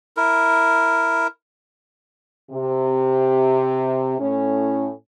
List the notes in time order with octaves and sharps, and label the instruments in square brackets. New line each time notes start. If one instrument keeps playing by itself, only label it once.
[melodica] E4 A#4
[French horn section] C3
A2 C#4